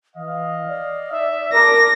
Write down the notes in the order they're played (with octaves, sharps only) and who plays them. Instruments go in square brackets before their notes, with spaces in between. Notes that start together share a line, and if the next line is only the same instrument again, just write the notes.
[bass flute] E3 [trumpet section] D#5 F5
[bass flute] D5
[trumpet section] D#4 E5
[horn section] A#4 [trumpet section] A5 D6 [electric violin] A#6